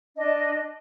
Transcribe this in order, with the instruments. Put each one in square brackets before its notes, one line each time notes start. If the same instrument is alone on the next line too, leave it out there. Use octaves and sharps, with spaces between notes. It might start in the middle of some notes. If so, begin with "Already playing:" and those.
[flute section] D4 D#5